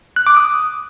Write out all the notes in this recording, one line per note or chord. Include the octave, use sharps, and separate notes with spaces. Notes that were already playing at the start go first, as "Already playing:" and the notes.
F#6
D6
D#6